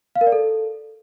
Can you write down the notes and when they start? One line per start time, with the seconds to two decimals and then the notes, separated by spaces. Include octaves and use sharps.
0.16 F5
0.21 A#4
0.27 D5
0.32 A4